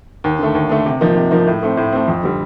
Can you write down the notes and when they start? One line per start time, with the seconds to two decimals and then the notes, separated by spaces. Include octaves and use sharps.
0.24 D#2
0.39 D3 A3
0.55 D#2
0.69 D3 A3
0.86 C3
1.01 F3 A#3 D#4
1.16 C3
1.31 F3 A#3 D#4
1.47 A2
1.63 A3 C4
1.77 A2
1.92 A3 C4
2.08 F2
2.23 D3 G3